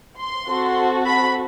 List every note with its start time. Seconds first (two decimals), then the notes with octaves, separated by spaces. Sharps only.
0.18 C6
0.47 C4 F#4 A4
1.06 B5